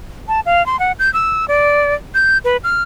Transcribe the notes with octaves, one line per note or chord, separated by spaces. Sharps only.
A5
F5
C6
F#5
G6
E6
D5
G6
B4
F6